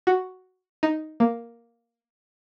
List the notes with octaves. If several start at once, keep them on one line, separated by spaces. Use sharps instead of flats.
F#4
D#4
A#3